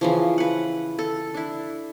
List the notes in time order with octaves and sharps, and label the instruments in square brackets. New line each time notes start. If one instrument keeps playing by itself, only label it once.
[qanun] C#3 E3 F3
B4 F#5
A4
D4 E4